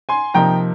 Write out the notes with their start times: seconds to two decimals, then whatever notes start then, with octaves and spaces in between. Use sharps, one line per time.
0.09 G#5 C6
0.34 C3 F3 A#3 D#4 G5 A#5